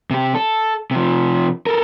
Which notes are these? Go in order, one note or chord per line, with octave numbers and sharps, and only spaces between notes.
C3 G4
A4
C3 F3
A4 A#4